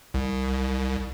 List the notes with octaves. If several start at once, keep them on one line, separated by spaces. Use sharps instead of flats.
C2